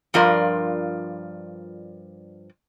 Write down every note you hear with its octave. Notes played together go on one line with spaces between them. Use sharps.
G2 F3 F4 A#4 D5